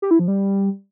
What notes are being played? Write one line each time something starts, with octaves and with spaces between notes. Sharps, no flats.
G4
E4
F3
G3